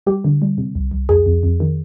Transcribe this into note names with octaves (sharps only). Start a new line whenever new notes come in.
G3 G4
D3
G3
C3
C2
C2
F2 G#4
F2
F2
D#3